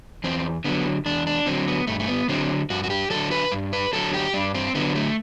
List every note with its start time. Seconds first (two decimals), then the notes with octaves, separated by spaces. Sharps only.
0.24 E2 C4
0.64 D3 F#3 B3
1.06 E2 D4
1.27 D4
1.46 D3 F#3 C4
1.68 B3
1.87 G2 A3
2.00 A3
2.08 B3
2.29 D3 F#3 C4
2.70 G2 F#4
2.84 F#4
2.90 G4
3.10 D3 F#3 A4
3.31 B4
3.52 G2
3.73 B4
3.93 D3 F#3 A4
4.14 G4
4.34 G2 D4
4.55 C4
4.75 D3 F#3 B3
4.95 A3